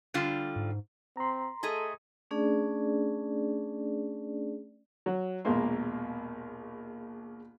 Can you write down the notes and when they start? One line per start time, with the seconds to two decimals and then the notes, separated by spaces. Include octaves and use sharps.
0.14 D3 G3 F4
0.56 G#2
1.17 C4 A#5 C6
1.63 A3 G#4 A4 D#5
2.31 A3 C#4 D4 G#4 D5
5.06 F#3
5.45 A#1 D#2 B2 G#3 A#3 C6